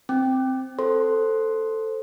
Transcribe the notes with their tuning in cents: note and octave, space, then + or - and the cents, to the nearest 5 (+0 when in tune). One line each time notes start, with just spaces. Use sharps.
C4 +0 G5 +0
A4 +10 C5 +0 C6 +0